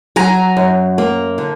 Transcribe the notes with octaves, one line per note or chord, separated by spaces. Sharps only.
F#3 G#5 A#5
F#2
A#3
D3